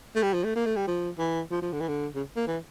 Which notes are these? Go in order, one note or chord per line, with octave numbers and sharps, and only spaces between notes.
A3
G3
F3
A3
A#3
A3
G3
F3
E3
F3
F3
D3
E3
D3
C#3
A#3
E3